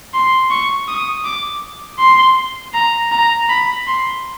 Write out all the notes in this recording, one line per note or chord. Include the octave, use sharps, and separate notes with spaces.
C6
C#6
D#6
D6
C6
A#5
A#5
B5
C6